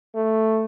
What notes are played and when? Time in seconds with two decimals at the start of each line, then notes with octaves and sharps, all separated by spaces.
0.15 A3